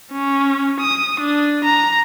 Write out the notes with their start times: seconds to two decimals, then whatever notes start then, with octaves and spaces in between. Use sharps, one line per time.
0.13 C#4
0.80 D#6
1.21 D4
1.65 A#5